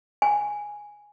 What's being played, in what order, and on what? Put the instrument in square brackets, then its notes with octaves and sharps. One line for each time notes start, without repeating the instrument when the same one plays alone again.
[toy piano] G#5